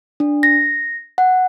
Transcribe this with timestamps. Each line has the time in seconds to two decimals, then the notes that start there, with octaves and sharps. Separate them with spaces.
0.20 D4
0.43 A#6
1.18 F#5